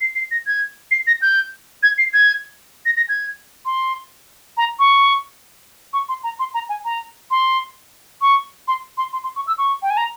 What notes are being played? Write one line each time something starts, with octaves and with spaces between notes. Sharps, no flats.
C7
C7
A#6
G#6
C7
A#6
G6
G#6
C7
G#6
A#6
A#6
G#6
C6
A#5
C#6
C#6
C6
A#5
C6
A#5
G#5
A#5
C6
C#6
C6
C6
C6
C6
C#6
E6
C#6
G5
G#5
A#5